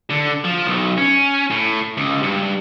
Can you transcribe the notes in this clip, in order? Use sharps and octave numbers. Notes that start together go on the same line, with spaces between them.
D3
F3
B1
C#4
A2
C#2
G2